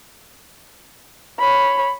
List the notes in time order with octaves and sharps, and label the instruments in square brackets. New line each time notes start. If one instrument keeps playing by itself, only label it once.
[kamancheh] C#5 B5